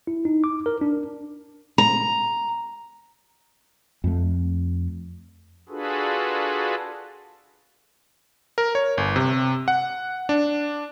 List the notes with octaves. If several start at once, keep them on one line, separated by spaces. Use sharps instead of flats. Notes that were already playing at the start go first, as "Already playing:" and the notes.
E4
D#4
D6
A#4
D4
A#5
F2 A3
D4 F4 F#4 G#4 A4 B4
A#4
C#5
G1
C3
F#5
D4